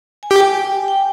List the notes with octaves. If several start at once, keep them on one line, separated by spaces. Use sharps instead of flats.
G#5
G4 G5
G5